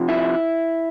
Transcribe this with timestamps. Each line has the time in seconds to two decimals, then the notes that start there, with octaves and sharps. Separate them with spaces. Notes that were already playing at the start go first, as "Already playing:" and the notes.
Already playing: C3 F3
0.09 E4